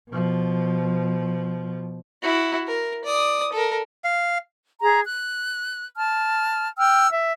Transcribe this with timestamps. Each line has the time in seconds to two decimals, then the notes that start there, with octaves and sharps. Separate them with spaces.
0.10 B2 F3
2.22 E4 F#4
2.67 A#4
3.05 D5 D#6
3.53 A4 A#4
4.04 F5
4.81 G#4 A#5
5.04 F#6
5.96 A5 F6
6.78 G5 E6 F6
7.11 E5